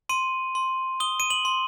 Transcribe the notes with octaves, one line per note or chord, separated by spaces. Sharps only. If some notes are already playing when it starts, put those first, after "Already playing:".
C6 D#7
C6
D#6 G7
D#7
F#7
C6